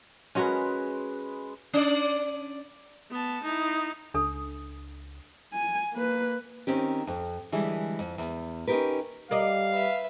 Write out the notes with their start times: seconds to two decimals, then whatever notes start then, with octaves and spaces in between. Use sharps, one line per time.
0.35 G#3 C#4 F#4 G#4 A#4 B4
1.73 C#4 D5
3.11 B3 A5
3.43 D#4 E4
4.14 C#2 D4 A4 D#6
5.53 G#5
5.94 A#3 B4
6.67 D#3 C4 C#4 G4
7.07 F2
7.52 D3 E3 G3 G#3
7.99 F2
8.18 E2
8.67 C#4 D#4 F4 G4 A#4 B4
9.31 G3 A#4 D5 D#5 F5
9.72 B4 E5